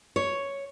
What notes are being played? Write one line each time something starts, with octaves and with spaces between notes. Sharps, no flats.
C#5